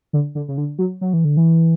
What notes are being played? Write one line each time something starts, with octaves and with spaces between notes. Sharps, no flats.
D3
D3
C#3
D3
F#3
F#3
E3
D3
E3